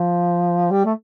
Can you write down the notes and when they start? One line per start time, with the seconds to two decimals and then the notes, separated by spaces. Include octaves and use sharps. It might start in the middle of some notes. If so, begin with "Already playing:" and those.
Already playing: F3
0.71 G3
0.85 A3